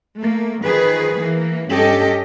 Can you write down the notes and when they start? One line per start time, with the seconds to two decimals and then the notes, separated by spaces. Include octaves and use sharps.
0.18 A3 A#3
0.63 D#3 F3 G#4 B4
1.20 E3 A#3
1.70 G2 C#4 G4 A4 D#5